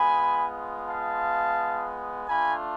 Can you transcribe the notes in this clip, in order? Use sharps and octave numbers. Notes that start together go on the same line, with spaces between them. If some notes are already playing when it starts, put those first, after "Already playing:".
Already playing: G#3 B3 F4 G#5 B5
F5 A5
A3 D4 F4 G#5 B5